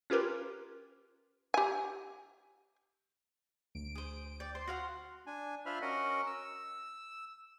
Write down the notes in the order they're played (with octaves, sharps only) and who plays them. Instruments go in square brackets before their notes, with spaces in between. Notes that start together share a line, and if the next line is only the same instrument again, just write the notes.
[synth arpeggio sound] C#4 F4 G4 A#4 B4
[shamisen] G4 G#5
[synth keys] D2 [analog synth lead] D7
[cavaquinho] G#4 C5
[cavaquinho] D5 [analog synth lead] G5
[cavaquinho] C5 [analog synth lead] C6
[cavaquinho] F#4 F5 F#5
[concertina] D4 G#5
D4 F4 C5 E5 B5 F6
C#4 F#4 A#4 D#5 F#5
E6